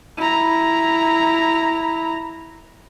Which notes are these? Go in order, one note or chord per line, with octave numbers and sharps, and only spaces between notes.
E4 A#5